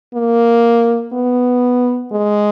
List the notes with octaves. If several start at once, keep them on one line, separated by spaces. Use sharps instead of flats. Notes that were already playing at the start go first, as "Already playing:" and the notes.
A#3
B3
G#3